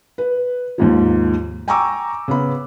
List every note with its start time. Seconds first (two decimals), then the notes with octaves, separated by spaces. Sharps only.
0.18 B4
0.78 D#2 G#2 F3
1.68 G5 G#5 A#5 C#6 D6 E6
2.28 C#3 B3 B5